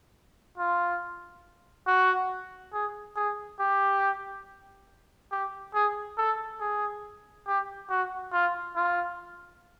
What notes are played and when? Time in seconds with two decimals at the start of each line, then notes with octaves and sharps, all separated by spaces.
0.58 F4
1.87 F#4
2.73 G#4
3.16 G#4
3.60 G4
5.32 G4
5.74 G#4
6.18 A4
6.61 G#4
7.47 G4
7.90 F#4
8.33 F4
8.76 F4